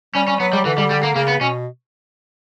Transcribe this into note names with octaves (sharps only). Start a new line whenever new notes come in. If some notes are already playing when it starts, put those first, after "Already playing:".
G3 C#4
C#4
F#3 B3
G3
D3 E3
G3
G3
A#3
C#3 A#3
B3
B2 C#4